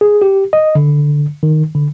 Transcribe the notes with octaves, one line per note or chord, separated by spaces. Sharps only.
G#4
G4
D#5
D3
D#3
D3